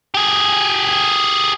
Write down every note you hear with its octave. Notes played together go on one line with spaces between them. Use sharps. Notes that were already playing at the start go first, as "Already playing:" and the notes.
G4 G#4